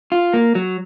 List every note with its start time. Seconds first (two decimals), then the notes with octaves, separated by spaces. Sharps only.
0.12 F4
0.34 A#3
0.55 F#3